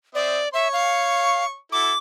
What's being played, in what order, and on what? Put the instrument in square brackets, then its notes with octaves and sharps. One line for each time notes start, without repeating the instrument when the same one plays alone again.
[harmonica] C4 E5 D#6 [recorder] D5
[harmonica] C#5 C#6 [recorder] E5
[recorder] F5
[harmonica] E4 F#4 A4 [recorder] D6